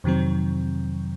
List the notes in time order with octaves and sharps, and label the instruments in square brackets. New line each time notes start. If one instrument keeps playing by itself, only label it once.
[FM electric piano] F2 C3 D#3 F#3 C4